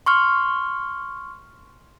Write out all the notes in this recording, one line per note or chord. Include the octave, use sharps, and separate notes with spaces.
C6 C#6 F6